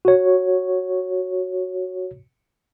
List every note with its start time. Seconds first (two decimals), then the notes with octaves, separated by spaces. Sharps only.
0.05 F#4 C#5